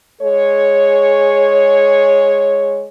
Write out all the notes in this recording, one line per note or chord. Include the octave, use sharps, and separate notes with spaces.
G#3 G#4 C#5